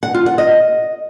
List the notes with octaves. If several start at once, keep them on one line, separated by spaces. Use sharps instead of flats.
F#5
F4
F#5
D#5